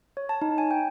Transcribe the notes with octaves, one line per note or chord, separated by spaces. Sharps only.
C#5
A5
D#4
G#5
G5